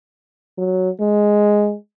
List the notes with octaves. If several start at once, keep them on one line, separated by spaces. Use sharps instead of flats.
F#3
G#3